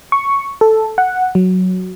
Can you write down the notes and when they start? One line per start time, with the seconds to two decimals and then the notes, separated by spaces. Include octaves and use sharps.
0.12 C#6
0.61 A4
0.98 F#5
1.35 F#3